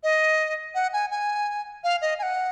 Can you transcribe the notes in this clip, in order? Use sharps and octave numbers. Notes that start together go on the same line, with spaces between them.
D#5
F#5
G#5
G#5
F5
D#5
G#5
F#5